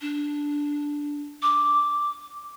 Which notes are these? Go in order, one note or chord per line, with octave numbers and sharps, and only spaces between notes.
D4
D6